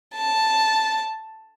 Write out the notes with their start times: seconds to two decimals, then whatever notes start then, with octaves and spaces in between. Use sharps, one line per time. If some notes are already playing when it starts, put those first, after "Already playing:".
0.15 A5